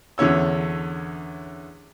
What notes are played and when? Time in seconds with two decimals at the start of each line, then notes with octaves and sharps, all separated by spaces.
0.18 E2 D3 C#4 C#5 E6